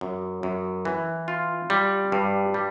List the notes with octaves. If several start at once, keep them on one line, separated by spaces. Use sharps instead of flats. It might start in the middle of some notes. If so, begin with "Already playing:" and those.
F#2
F#2
E3
F4
G3
G2
G3